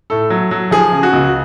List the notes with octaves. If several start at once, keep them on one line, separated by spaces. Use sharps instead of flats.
A2 A4
F#3
F#3
F3 G#4
C#3
F#4
C#2